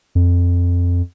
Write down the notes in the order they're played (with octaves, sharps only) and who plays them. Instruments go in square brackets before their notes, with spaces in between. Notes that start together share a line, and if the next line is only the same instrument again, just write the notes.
[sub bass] F2